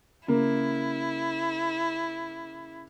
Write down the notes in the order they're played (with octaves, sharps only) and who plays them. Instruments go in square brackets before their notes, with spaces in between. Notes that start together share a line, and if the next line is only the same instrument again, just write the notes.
[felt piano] C#3 A#3 [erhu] E4